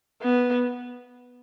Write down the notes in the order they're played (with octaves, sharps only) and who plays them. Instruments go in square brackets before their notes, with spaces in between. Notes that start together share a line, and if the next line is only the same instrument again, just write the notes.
[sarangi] B3